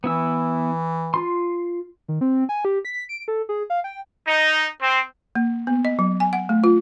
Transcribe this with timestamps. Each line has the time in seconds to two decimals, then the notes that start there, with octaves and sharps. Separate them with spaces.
0.04 E3 B3 E4 E6
1.14 F4 C6
2.08 D#3
2.21 C4
2.49 G#5
2.65 G4
2.85 B6
3.09 D7
3.28 A4
3.49 G#4
3.70 F5
3.84 G5
4.27 D#4
4.81 C4
5.35 A#3
5.67 B3
5.85 D#5
5.99 F#3
6.20 G#5
6.33 F#5
6.49 A3
6.64 F4